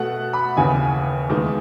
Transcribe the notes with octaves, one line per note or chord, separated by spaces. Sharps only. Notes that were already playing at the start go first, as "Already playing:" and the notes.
Already playing: B2 A3 F#5
B5
D#2 C#3 E3 B3 G#5
E2 D#3 G#3 B3